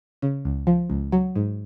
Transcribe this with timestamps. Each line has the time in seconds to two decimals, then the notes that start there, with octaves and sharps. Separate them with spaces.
0.22 C#3
0.45 C#2
0.67 F3
0.90 C#2
1.12 F#3
1.36 G#2